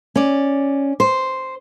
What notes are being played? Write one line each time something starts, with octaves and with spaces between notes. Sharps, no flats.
C#4 D5
C5